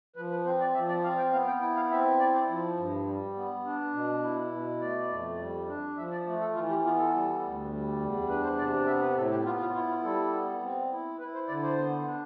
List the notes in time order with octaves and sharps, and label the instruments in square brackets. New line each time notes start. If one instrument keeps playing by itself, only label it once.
[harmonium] F3 B4
B4
C4 C5
D5
F3 E5
D5
C4 F5
G5
B3 F5
G5
E4 G5
F5
C4 E5
E4 D5
C5
F3
G2
G3
B3
D4
B2
E4
B2
A3 D5
F2
G3
D4
F3 E5
D5
A3
A4
E3 F4
G4
B3 F4
A4
G3
D2
G3
E2
D4 B4
C5
C3 D5
B3 E5
B4
A2 A4
G4
B3 F4
F4
E4 F4
F4
G3 A4
B3
C4
E4
E4 B4
C5
D3 D5
C5
B3
D4